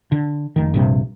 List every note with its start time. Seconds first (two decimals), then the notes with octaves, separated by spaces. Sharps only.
0.12 D3
0.56 F1 D#3
0.74 A#1 G2 C3